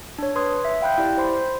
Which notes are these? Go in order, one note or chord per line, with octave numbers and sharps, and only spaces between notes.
D4 C#5
B4 C6 D#6 G#6
E5
F5 G5 B5 F#6 G6
E4 G4 D5
C5 B5 C6